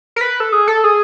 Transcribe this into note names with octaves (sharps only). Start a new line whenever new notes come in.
A#4
B4
A4
G#4
A4
G#4